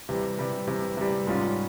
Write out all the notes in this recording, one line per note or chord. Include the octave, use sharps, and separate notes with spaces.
C3 E3 G3
C3 E3 G3
C3 E3 G3
C3 E3 G3
G#2 G3 C#4 F4